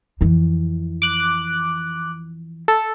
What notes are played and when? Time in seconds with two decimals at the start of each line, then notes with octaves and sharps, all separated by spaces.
0.21 F2 E3
1.02 D6 F#6
2.68 A4